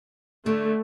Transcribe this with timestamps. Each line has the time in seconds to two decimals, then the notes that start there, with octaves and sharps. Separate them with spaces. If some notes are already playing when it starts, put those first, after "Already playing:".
0.46 D3 A3